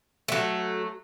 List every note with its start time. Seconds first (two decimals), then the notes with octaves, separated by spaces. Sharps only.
0.28 F#3 A3